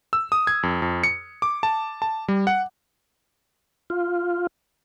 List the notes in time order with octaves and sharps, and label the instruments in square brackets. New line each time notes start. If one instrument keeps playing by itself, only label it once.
[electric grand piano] E6
D#6
G#6
F2
F2
C#7
D6
A5
A5
G3
F#5
[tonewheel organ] F4